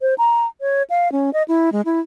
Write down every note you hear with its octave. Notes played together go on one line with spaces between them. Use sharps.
C5
A#5
C#5
F5
C#4
D#5
E4
G#3
E4